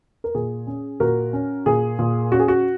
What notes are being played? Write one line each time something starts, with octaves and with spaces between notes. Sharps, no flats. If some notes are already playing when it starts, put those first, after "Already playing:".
A#4
A#2 G#4
C#4
A#2 F#4 A#4
C#4
A#2 G#4
A#2
C#4 F#4
G#4
F#4